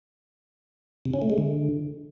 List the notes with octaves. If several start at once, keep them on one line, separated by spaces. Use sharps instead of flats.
C3
C#4
A3
G#3
D3